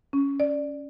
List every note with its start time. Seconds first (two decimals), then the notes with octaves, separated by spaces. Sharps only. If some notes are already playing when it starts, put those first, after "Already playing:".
0.13 C#4
0.40 D5